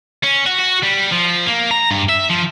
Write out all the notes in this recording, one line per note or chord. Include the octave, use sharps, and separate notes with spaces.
C#4
F#4
F#4
G3
F3
A#3
A#5
G2
E5
F3